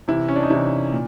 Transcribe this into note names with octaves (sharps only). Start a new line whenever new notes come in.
C3 E3 E4
C#4
D4
D#4
C3 E3 E4
A#2